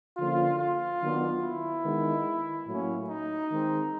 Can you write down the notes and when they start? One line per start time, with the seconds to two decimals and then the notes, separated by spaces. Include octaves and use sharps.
0.17 D3 F3 A#3 C#4 F4
0.58 F4
1.01 D#3 F#3 B3 D4
1.43 E4
1.84 D#3 G#3 B3
2.67 A2 F#3 A#3 C#4
3.09 D#4
3.50 D#3 G#3 C4